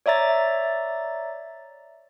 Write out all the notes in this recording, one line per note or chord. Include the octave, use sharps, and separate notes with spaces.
C#5 D5 E5 A#5 A6